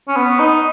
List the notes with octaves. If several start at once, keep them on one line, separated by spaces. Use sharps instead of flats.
C#4
B3
D#4